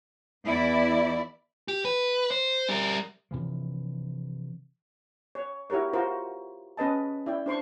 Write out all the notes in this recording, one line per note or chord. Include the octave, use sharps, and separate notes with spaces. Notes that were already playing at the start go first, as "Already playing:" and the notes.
E2 E4 D5
G4
B4
C5
G3 A#4
C3 E3 F3
C#5
E4 F#4 G4 A#4 C#5
F4 F#4 A#4 C5
C#4 B4 D#5 A5
E4 D5 G5
D4 C5 C6 C#6